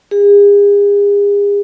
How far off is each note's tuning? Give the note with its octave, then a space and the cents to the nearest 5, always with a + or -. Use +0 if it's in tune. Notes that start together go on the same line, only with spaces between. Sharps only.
G#4 -40